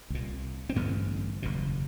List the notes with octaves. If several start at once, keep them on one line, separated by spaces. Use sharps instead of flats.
C2 A#2
C4
A1 G2 D3 B3
F#1 E2 B2